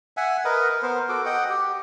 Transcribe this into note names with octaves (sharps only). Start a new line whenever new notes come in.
E5 F#5 G#5
A#4 B4 D#5
B3 A#4 C5
F#4 A4 D6
D#5 F#5 G5
G4